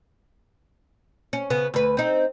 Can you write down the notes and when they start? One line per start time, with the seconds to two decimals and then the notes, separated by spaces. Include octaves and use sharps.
1.33 C#4
1.50 C#3 B3
1.74 D2 B4
1.97 C4 D#4